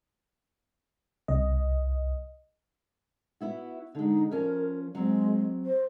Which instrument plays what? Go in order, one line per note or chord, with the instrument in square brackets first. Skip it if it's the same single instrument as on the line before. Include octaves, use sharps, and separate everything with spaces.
[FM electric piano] C2 D#5
[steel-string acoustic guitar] B3 E4 F#4
[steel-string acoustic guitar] D3 G#3 [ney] D#4
[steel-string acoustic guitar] F3 C#4 [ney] A#4
[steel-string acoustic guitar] F#3 C4 [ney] G#3
[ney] C5